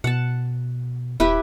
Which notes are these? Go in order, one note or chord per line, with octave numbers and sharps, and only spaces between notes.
B2 F#5 A5
D#1 E4 G4 B4